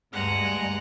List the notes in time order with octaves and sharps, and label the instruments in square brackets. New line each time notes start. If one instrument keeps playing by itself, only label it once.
[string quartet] D2 G2 G#3 [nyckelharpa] F#5 A#5